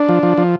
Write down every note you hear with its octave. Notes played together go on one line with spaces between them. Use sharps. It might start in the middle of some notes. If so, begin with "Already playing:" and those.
Already playing: D4
F3
F3
F3